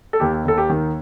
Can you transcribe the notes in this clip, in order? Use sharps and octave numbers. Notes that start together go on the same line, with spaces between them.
A4
D#2 G4
D#2 A4
G4
D#3